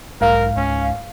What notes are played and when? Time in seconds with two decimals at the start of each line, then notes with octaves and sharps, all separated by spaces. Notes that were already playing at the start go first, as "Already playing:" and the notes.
0.21 B1 G#2 A#4 F5
0.56 C#2 C#4